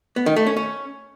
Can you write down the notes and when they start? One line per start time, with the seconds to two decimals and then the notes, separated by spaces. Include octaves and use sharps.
0.16 B3
0.26 D#3
0.36 A3
0.47 C#4
0.57 C#4